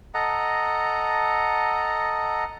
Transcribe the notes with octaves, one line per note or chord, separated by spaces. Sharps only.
A4 D#5 F#5 A#5